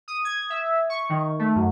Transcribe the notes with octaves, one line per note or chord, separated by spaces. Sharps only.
D#6
G#6
E5
C#6
D#3
A3
F#2